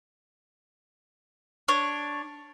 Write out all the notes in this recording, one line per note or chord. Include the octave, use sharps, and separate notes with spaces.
D4 C#5